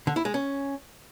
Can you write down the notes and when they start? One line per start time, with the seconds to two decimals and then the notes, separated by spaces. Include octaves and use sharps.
0.07 D3
0.16 E4
0.25 G#3
0.34 C#4